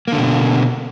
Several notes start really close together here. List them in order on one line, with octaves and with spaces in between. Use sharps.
A#3 D3 B2